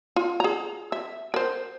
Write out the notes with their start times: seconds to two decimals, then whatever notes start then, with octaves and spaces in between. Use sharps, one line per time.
0.16 F4
0.40 G#4 A#5
0.92 E5
1.34 A#4 C5